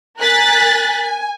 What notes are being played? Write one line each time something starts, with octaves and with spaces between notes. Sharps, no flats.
A#4 G#5 F#6 A6 B6
G#5